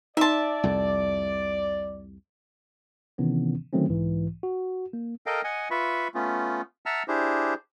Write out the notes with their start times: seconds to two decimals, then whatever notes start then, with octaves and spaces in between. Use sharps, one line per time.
0.17 D#4 D5 E5 A5 C6
0.63 C2 F2
3.18 C3 D#3 E3 B3 C#4
3.73 D3 D#3 F#3 A3 C4 C#4
3.89 B1 G#2 E3
4.43 F#4
4.93 A#3
5.26 A4 A#4 D#5 F5 G5
5.44 D#5 F#5 G#5
5.71 F4 B4 E5 B5 C#6
6.14 A3 B3 C#4 F4
6.86 E5 F#5 A5 A#5 E6 F6
7.08 D4 E4 G4 G#4 C5